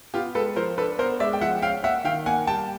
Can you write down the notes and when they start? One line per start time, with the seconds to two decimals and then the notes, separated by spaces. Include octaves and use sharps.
0.14 B3 F4 G4
0.35 G#3 A4 B4
0.56 F3 A#4 C5
0.78 D4 A4 B4
0.99 B3 A#4 C5
1.20 G#3 D5 E5
1.33 G5
1.41 F3 E5 F#5
1.62 C#4 F5 G5
1.84 A#3 E5 F#5
2.05 D#3 F5 G5
2.26 A#3 F#5 G#5
2.47 G3 G5 A5